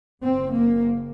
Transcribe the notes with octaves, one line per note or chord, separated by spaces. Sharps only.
F#1 F#2 C4
A#3